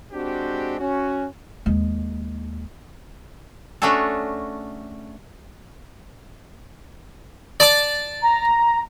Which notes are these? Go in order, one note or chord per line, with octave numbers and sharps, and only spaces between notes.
G#3 C4 D4 F#4 G4
C#4 F#4
D#2 G#3
A3 C#4 D4 F#4 G#4 A4
D5 A5 D6
A#5